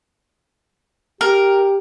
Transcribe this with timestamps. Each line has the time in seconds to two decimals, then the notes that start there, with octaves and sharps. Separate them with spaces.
1.21 G4 A#4